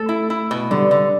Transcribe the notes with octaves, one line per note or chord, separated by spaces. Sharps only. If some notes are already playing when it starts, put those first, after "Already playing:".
Already playing: A3 A4
E4
E4
B2
D3 G3
D3